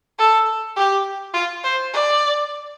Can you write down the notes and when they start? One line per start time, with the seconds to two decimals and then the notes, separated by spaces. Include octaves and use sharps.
0.19 A4
0.76 G4
1.34 F4
1.64 C5
1.93 D5